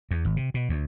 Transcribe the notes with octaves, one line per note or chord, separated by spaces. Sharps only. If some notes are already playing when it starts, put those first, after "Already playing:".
E2
G#1
C3
B2
D2